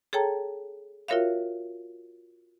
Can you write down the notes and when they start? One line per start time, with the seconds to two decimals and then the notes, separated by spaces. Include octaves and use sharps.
0.13 G#4 A4 C#5 G5 A5 A#5
1.08 F4 F#4 A#4 C#5 E5 F5